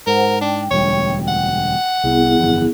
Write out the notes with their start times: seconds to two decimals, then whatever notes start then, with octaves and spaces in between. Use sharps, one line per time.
0.07 G#2 A#4 C5 F#5
0.41 D4 G5
0.71 E1 D2 G3 C#5
1.28 F#5
2.04 C2 B3 E4 G#4
2.38 G1 F2 E3